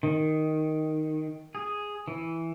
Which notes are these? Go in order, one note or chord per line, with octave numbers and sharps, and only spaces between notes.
D#3
G#4
E3